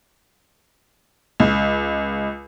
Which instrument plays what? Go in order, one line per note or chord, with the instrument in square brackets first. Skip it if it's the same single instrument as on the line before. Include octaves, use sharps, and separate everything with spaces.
[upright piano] C#2